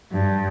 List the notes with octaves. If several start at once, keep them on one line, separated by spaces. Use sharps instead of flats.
G2